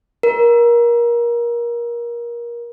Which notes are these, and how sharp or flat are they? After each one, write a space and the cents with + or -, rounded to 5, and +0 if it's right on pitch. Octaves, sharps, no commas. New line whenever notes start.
A#4 +25